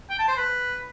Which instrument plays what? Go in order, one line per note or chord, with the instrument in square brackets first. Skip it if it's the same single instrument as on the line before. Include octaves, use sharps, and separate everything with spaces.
[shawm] G5
A5
C5
B4